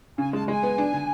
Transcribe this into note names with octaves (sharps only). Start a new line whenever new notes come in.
C#3 G#5
G#3 A5
G#3 G#5
B3
D4
D3